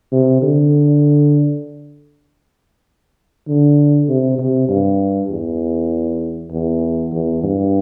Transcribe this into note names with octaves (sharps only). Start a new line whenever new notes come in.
C3
D3
D3
C3
C3
G2
E2
E2
E2
G2